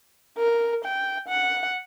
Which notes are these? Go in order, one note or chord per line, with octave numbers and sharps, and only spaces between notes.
A#4
G5
F#5